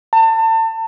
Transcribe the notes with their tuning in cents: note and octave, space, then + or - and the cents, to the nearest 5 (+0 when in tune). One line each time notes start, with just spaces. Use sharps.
A5 +35